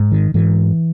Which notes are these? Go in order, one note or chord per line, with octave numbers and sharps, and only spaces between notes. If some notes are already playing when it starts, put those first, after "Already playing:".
Already playing: G#2
D#3
G#2 E3